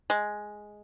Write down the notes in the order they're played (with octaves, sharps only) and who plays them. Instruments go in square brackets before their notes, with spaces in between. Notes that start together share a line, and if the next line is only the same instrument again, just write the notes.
[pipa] G#3